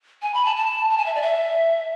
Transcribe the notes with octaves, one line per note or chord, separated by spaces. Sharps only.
G#5
B5
A5
A5
A5
G#5
E5
D5
E5